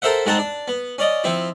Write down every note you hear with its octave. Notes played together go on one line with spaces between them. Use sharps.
A4 A#4 C5 E5 F#5
G#2 G#3 C4 F#5 A5 A#5
D4
B3
C#4 D5 D#5
F3 C4 E4